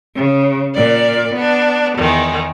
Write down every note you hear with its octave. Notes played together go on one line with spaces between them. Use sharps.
C#3
A#2 D5
B3 D4
E2 D#3 G#3